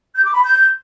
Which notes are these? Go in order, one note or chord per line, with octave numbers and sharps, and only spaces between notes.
G6
D6
B5
G6